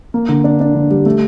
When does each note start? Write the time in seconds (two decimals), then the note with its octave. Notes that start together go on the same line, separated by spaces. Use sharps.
0.14 A#3
0.29 D3
0.44 D4
0.60 D4
0.75 D3
0.91 G3
1.06 A3